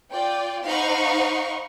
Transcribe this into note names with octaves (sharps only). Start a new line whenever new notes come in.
F4 D5 G5
D#4 C5 F5 F#5 B5 C#6